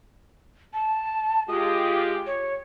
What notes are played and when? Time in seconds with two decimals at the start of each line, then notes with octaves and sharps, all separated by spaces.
0.74 A5
1.48 G#3 F4 G4 D#6
2.27 C#5